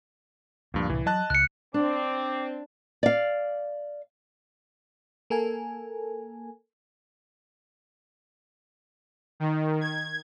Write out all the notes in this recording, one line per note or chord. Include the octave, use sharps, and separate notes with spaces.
D2 G2 A#2 F3
C2 A2 E3
F#3 D#5 A5 F#6
C#2 F#6 C#7
C4 D4 D6
D5 F5
A#3 A4 A#4 G#5
D#3
G#6